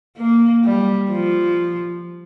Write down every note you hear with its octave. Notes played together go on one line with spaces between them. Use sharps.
A#3
G3
F3